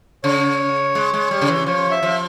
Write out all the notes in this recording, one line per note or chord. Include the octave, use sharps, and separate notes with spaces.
C#3 C#5
G#3
G#3
G3
C#3
E3
F3 C#5
E5
F3